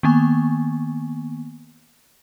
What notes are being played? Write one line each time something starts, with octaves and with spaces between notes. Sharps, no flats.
D#3 A#3 B3 G#5 C#6